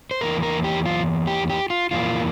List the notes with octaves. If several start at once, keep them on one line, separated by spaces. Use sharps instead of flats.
C5
E2 E3 A#3 A#4
A#4
G4
F4
G4
G4
F4
F2 E3 A#3 F4